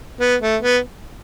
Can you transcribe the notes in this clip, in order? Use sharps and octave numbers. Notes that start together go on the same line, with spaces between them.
B3
A3
B3